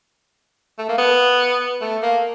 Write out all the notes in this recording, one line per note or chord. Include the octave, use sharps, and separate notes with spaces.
A3
A#3
B3
A3
A#3